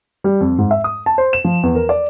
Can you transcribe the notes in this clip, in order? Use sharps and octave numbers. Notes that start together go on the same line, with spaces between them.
G3
F2
G#2
E5
D#6
A5
C5
E7
F3
E2
A#4
D5